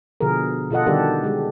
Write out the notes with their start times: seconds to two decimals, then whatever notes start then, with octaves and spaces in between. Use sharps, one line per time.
0.21 B2 D3 F3 G#4 A#4
0.71 B2 F4 A4 D#5 F#5
0.87 D3 D#3 G3 D4 G4 A4
1.24 G#3 G4